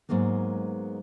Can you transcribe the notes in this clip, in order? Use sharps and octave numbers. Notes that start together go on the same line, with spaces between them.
G#2 F#3 G#3 A#3 B3